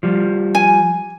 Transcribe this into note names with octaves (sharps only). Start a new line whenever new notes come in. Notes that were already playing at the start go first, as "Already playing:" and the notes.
F3 G3
G#5